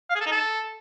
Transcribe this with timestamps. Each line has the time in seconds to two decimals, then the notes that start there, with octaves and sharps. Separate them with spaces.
0.10 F5
0.15 G#4
0.21 A4
0.26 D#4
0.32 A4